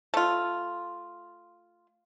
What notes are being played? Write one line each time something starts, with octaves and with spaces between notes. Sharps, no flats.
A3 F4